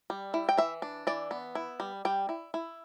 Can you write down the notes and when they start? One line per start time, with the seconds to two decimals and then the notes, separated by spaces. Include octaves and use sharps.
0.10 G3
0.34 E4
0.49 G5
0.58 E3 E5
0.82 D4
1.07 E3 D5
1.31 B3
1.55 E4
1.80 G3
2.05 G3 G5
2.29 E4
2.54 E4